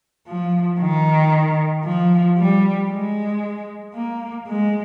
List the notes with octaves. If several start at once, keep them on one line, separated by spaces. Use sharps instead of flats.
F3
D#3
F3
G3
G#3
A#3
G#3